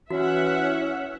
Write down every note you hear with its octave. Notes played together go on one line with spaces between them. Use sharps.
E3 C#4 F#4 E5 F#5